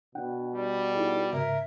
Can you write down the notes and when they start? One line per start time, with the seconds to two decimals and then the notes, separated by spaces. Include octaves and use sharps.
0.15 B2 D4 F#5 G5
0.54 G3
0.94 D#4 E4 G#4
1.33 G#2 C#3 A#4 E5